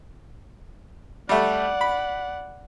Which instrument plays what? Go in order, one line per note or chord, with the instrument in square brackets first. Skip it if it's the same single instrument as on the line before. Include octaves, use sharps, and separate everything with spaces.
[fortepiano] G3 A3 [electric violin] D5 F#5
[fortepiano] B5